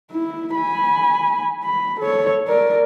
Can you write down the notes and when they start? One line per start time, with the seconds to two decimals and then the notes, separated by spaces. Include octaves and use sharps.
0.11 E4
0.55 G#5 B5
1.64 B5
2.00 A4 C#5
2.47 A#4 D5